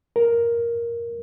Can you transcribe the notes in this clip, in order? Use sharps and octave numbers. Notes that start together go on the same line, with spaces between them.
A#4